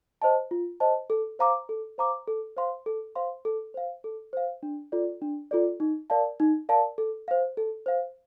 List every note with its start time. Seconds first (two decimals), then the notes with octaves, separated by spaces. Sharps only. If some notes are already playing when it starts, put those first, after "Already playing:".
0.22 C5 D#5 A5
0.51 F4
0.80 C5 D#5 A5
1.10 A4
1.39 C5 F5 A#5 D6
1.69 A4
1.98 C5 F5 A#5 D6
2.28 A4
2.57 C5 F5 C6
2.86 A4
3.15 C5 F5 C6
3.45 A4
3.74 C5 F5
4.04 A4
4.33 C5 F5
4.63 D4
4.92 F4 A4 D5
5.22 D4
5.51 F4 A4 D5
5.80 D#4
6.10 A#4 D5 F5 A5
6.40 D#4
6.69 A#4 D5 F5 A5
6.98 A4
7.28 C5 F5
7.57 A4
7.86 C5 F5